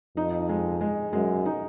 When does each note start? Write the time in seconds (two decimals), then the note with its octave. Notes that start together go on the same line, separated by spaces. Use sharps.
0.17 F2 D#4
0.49 G#3
0.81 G#3
1.13 F#2 G#3
1.46 D#4